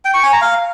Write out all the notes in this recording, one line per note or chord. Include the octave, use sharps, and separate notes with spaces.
G5
C#6
G#5
A#5
F5